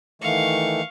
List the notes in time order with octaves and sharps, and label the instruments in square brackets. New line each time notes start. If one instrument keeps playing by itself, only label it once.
[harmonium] D#3 E3 A3 [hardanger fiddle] F5 C#6